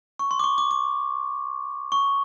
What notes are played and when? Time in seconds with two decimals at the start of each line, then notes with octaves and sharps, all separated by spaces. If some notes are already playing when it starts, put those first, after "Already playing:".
0.19 C#6
0.31 C6
0.39 D6
0.44 C#6
0.58 D6
0.71 D6
1.92 C#6